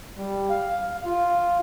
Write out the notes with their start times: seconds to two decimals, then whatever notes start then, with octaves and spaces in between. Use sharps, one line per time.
0.17 G3
0.50 F5
1.06 F4